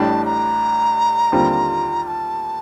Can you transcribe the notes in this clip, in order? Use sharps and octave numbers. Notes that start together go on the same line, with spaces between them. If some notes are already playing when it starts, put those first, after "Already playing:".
Already playing: A1 A2 G3 D4 A5
A#5
D#2 D3 G3 C4 F4
A#5
A5